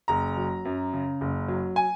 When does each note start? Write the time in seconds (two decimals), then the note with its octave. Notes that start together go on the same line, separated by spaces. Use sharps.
0.08 F#1 A#5
0.37 F#3
0.65 F#2
0.93 C#3
1.21 F#1
1.48 F#3
1.76 G#5